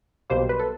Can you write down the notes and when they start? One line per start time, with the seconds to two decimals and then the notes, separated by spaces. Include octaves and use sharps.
0.30 B1 B2 G3 A#3 C5
0.49 B4
0.59 A4